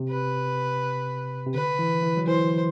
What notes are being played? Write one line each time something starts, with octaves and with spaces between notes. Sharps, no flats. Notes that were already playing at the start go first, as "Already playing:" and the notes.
Already playing: C3
B4
C3
D3 B4
E3
E3
F#3
E3 C5